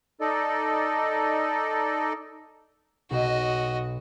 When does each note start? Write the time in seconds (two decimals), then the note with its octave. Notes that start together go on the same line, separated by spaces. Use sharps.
0.21 D#4 A4 D5 D#5
3.11 B1 F#4 D#5